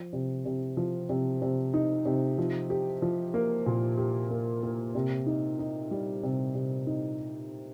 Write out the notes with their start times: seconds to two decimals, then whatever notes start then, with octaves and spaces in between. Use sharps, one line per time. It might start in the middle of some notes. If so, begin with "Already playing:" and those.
Already playing: F3
0.13 C3
0.45 C3
0.77 F3
1.09 C3
1.42 C3
1.74 D#4
2.05 C3
2.38 F3
2.70 G4
3.02 F3
3.34 A#3
3.66 A#2
3.98 G4
4.30 A#3
4.63 A#3
4.95 C3
5.26 D#4
5.59 D#4
5.91 G3
6.23 C3
6.55 C3
6.87 D#4